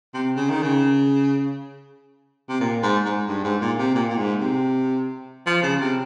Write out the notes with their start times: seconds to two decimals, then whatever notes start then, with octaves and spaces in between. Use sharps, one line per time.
0.14 C3
0.36 C#3
0.50 D#3
0.63 C#3
2.49 C3
2.60 A#2
2.83 G#2
3.05 G#2
3.28 G2
3.44 G#2
3.61 A#2
3.78 C3
3.95 A#2
4.09 A#2
4.18 G#2
4.40 C3
5.46 F3
5.63 C#3
5.81 C3